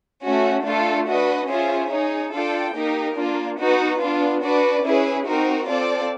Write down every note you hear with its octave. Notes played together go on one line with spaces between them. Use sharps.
A3 C#4 F#4
A3 D4 F4 A4
D4 F#4 B4 D#5
C#4 F4 G#4 C5 E5
D#4 G#4 C#5
D4 F4 A4 D5 G5
A#3 D#4 G4 A#4
A#3 D4 F4
B3 D#4 F#4 B4
B3 D4 F4
D4 F#4 B4 D5
C#4 E4 G#4 B4
C4 D#4 F#4 A#4
C4 F4 A4 D5